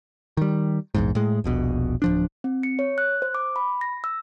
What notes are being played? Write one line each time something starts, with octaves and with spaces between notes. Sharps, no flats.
D#3 G3
A#1 E2 G#2
A2 G#3
D#1 A#1 B2
D1 F3 D4
C4
C#7
C#5
F#6
C5
D6
B5
A#6
E6